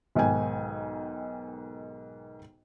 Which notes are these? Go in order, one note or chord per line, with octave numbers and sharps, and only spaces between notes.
B1 G#2 D#3 G5 G#5